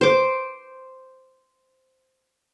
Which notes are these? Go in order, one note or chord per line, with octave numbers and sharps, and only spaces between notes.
C5 D6